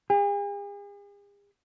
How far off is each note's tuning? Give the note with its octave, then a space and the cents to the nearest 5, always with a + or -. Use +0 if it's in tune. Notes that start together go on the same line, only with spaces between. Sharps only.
G#4 -45